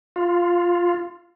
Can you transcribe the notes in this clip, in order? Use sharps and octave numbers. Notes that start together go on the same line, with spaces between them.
F4